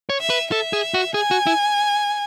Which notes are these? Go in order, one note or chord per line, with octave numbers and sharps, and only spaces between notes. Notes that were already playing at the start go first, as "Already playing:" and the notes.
C#5
E5
B4
A4 E5
G#4
F#4
G#4 G#5
F#4
E4